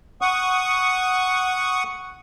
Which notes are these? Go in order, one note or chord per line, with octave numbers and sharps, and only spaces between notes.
F#5 C#6 D#6